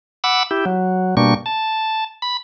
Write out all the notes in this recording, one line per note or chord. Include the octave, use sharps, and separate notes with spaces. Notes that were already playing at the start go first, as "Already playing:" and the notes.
F#5 B5 D6 E6
E4 G4
F#3
B2 G3 A#3 D4 C#6
A5
B5